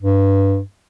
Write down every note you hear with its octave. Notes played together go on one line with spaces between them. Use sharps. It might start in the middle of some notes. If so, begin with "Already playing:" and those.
G2